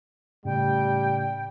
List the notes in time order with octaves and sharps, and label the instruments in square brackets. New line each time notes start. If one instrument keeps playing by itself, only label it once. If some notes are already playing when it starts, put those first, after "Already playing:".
[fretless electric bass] A2 C#3 [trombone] G3 [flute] G5